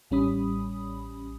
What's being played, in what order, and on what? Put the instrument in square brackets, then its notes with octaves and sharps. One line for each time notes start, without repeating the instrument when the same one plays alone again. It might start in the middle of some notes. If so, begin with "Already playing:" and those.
[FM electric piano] A1 G3 C#4 B5 D#6